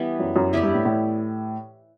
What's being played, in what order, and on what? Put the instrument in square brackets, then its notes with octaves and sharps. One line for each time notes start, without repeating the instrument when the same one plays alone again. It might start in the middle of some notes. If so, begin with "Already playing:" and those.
Already playing: [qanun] E3 G3 B3
[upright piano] F#2
F#2
[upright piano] E2 [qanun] B3 E4 G4 D5
[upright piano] G2
A2
A2